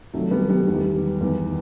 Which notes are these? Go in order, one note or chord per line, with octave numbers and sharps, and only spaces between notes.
C2 C3 D#3 F#3 A3
G3 B3
G3 B3
E2 D#3 G3 B3
E2 D#3